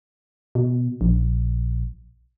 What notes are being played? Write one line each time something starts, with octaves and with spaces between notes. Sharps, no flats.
B2
A#1